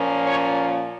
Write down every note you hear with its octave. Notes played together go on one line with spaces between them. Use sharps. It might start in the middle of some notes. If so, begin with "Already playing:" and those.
Already playing: A#2 F3 A#3 C#4
C#5